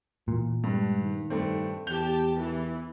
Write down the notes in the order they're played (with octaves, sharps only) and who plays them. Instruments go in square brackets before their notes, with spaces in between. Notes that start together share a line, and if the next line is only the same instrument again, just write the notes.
[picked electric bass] A#2 [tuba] E3
[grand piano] G2 [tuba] G#3
[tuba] D#3
[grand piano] G2 A3 C4
[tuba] E2 [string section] G4 A5 [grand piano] G6 F7 G7
[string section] E3